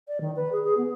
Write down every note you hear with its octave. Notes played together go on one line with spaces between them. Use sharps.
D5
D#3
B4
G#4
G#4
B3